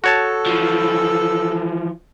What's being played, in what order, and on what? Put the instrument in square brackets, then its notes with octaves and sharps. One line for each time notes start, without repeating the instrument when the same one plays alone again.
[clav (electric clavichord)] F#4 C#5 A5 [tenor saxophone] A4
[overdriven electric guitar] E3 F3